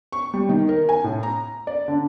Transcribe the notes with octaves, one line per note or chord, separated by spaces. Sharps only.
C#6
G3
D#3
A#4
G#5
A2
A#5
D5
D3